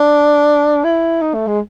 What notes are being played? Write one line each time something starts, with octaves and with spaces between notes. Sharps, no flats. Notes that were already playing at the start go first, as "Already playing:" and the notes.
Already playing: D4
E4
D#4
A3
G#3